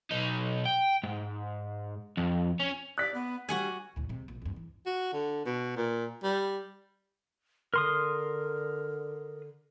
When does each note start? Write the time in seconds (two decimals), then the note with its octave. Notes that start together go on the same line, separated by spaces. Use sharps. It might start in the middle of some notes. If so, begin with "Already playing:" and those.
0.11 B1 D#4
0.66 G5
1.03 G#2
2.17 F2
2.60 C#4
2.98 D5 F#6 B6
3.14 B3
3.49 G3 F#4 F#5 G#5
3.96 D2 A2
4.09 C3 G#3
4.28 A#1
4.42 D1 G2
4.56 E3
4.86 F#4
5.13 D3
5.46 B2
5.76 A#2
6.23 G3
7.74 D3 A#4 C6 D#6